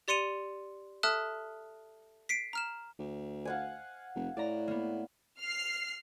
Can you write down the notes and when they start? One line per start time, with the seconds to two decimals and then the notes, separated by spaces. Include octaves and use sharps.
0.08 G4 D5 C6 C#7 D#7 F7
1.03 A4 E5 A5 D#6 F6 F#6
2.29 B6 C7 D7
2.53 A#5 F6 E7
2.99 D2
3.45 F5 F#5 G#5
4.15 F1
4.37 A2 D5 A#5
4.68 A#3 B3
5.39 F6 C7